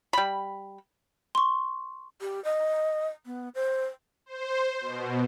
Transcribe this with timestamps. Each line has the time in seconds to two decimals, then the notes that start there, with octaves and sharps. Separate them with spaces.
0.13 G3 B5
1.35 C6 C#6
2.21 G4
2.44 D#5
3.26 B3
3.55 C5
4.26 C5
4.81 B2